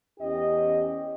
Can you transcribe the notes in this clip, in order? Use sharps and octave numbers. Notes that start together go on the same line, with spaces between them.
E2 C#4 G4 D#5